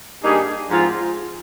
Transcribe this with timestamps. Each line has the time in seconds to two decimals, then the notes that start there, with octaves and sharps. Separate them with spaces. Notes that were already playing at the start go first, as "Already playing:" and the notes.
0.23 G2 G3 A#3 D#4 G#4
0.69 G#2 F3 C4 F4